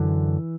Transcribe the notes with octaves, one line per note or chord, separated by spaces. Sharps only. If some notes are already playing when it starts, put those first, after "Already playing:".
Already playing: F#2 D3 E3